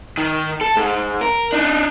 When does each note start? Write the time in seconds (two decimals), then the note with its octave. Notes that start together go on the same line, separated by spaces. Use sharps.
0.17 D#3
0.61 A4
0.77 G#2
1.21 A#4
1.52 D4 D#4